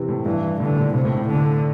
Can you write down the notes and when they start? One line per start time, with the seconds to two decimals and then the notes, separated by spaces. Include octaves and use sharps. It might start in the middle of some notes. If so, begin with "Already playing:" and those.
Already playing: C3 E3
0.09 A2
0.26 G2 E3
0.60 A2 D3
0.77 A#2
0.94 A2 C3
1.05 A2
1.17 A2
1.28 D3